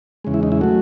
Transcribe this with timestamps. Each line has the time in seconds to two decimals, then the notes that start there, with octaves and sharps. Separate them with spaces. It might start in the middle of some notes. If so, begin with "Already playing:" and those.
0.25 E2 C#3 G#3
0.34 E4
0.43 D#4
0.52 E4
0.61 F#3 A3 F#4